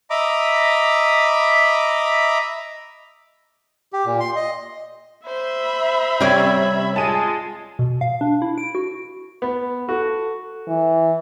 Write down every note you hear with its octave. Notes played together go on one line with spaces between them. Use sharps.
D#5 E5 A#5 B5 D6
G4
A#2
C6
D#5
C5 E5 B5
C3 G3 C#4 D5 G#6
G#3 F4 G#4 A5 D#7
B2
F5
D4
E4
D7
F#4
B3
F#4 A4
E3